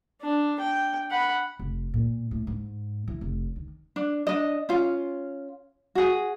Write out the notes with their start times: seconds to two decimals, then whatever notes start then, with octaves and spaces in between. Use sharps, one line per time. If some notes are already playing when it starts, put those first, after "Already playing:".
0.22 D4
0.60 G5
1.11 F#5 B5
1.59 F1
1.94 A#2
2.31 A2
2.47 G#2
3.08 E3
3.21 F1
3.56 D#3
3.96 D4
4.27 D4 D#5
4.69 C#4 F4
5.95 F#4 G#4